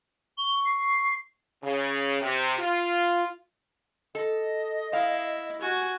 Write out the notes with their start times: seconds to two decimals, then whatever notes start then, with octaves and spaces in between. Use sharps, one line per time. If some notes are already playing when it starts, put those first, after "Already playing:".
0.38 C#6 G7
0.66 C7
1.63 C#3
2.21 C3
2.58 F4
4.15 A4 D#5
4.93 E4 F5
5.61 F#4 G#5